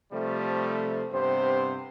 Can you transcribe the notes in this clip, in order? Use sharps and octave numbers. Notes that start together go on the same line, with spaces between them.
C3 F3 G3 A3
G2 C3 B3 C4 C5